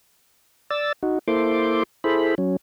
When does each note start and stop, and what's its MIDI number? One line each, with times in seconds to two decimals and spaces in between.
0.70 0.92 74
0.70 0.92 88
0.70 0.92 93
1.03 1.19 63
1.03 1.19 66
1.28 1.83 58
1.28 1.83 64
1.28 1.83 69
1.28 1.83 72
1.28 1.83 84
1.28 1.83 86
2.04 2.35 64
2.04 2.35 68
2.04 2.35 69
2.04 2.35 72
2.04 2.35 83
2.38 2.56 54
2.38 2.56 61